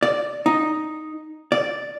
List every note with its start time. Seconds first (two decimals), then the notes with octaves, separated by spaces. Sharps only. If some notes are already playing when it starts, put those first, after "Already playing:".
0.03 D5
0.46 D#4
1.52 D5